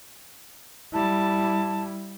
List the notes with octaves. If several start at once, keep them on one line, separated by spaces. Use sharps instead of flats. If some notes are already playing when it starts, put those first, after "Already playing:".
G3 E4 A5